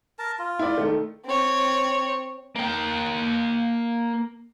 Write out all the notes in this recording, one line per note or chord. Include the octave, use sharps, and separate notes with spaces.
A#4 A5
F4
E4 D5
D#3 A3
C4 C#5
A#3 G5